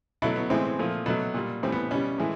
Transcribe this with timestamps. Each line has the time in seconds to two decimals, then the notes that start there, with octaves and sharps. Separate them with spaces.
0.22 B2 F#3 A3 E4
0.36 B3
0.50 A2 E3 G#3 C4
0.79 A#2 F3 A3
1.06 B2 F#3 A3
1.34 A#2 G3
1.63 A2 E3 G3 C4
1.72 B3
1.91 B2 G3 C#4
2.18 A2 E3 G#3